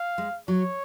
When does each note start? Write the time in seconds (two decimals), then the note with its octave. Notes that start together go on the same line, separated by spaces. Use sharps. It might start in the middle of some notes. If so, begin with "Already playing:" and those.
Already playing: F5
0.18 G#3
0.48 F#3 C#5